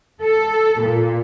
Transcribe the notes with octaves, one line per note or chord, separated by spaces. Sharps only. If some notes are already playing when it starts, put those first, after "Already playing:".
A4
A#2